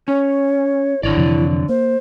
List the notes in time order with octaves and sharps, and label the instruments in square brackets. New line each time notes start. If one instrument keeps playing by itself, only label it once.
[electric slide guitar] C#4 [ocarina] C#5
[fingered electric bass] G#1 [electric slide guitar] D3 C#5 D5 [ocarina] E4
[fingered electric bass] F2 C3 E3
[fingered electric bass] A#3 [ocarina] C5